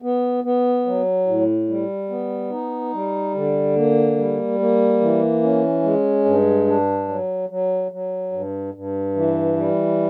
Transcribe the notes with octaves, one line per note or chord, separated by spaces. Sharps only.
B3
B3
F#3
A2
G3
B3
D#4
G3
D3
A#3
G3
A#3
E3
C#4
G#3
G2
D4
F#3
F#3
F#3
G2
G2
E3
G3